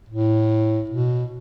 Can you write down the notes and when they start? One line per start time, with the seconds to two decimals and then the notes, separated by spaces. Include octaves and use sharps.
0.09 A2
0.90 B2